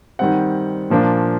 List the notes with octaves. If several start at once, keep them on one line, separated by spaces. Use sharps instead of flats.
D#3 G3 C4 F#5
A#2 F3 A#3 D4